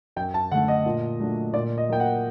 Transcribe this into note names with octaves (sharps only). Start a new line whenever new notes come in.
F#2 G5
A5
D3 A3 F#5
D#5
A#2
F#3 A3 D4
A#2 D5
D#5
F#3 A#3 G5
F#5